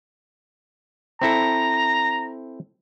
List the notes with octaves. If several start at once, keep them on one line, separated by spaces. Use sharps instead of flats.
C4 E4 A4 A#5